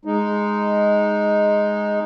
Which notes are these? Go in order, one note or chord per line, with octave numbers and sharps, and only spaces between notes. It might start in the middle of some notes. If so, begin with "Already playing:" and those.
G#3 D#4